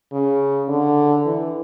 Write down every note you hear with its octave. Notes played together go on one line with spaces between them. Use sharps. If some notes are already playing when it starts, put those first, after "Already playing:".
C#3
D3
E3